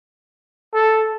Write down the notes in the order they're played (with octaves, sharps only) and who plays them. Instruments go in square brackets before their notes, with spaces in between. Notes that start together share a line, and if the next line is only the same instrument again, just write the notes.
[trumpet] A4